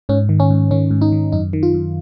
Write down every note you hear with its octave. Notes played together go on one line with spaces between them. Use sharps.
G#2 C#4
D#3
C#4
G#2
D#3 C#4
G#2
D#4
D#3
F#2 D#4
D#3
F4
F#2